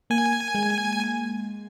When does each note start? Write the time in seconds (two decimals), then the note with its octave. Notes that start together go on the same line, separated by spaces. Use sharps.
0.10 A#3 G#5
0.55 G#3